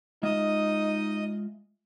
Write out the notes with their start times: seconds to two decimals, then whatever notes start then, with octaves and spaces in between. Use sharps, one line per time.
0.23 G#3 D#4 F4 D#5 E5